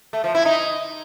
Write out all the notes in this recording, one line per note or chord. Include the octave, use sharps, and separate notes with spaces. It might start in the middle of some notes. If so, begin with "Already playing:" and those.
A3
F3
E4
D#4